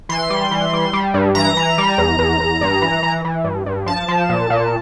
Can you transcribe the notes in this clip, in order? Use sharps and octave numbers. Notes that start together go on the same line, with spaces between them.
E3 C6
G3
E3
G3
G3
G2
E3 A#5
E3
G3
E2
E2
E2
G2
E3
E3
E3
G2
G2
F3 A5
F3
A#2
A#2